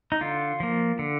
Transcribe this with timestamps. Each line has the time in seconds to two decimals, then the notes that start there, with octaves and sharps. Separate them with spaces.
0.12 D#4
0.21 D3 F4
0.60 F3 A#3
0.99 D3